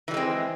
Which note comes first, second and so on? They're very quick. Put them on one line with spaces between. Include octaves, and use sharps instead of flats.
E3 G3 G#3 C4